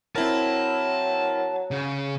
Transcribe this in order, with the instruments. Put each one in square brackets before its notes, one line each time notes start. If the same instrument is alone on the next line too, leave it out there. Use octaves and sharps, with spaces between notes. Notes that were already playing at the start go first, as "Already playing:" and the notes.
[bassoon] F#3 [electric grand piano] C4 E4 A#4 [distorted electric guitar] A5
[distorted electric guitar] C#3